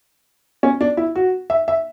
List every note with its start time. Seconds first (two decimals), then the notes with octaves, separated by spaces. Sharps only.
0.63 C#4
0.81 D4
0.97 E4
1.15 F#4
1.50 E5
1.68 E5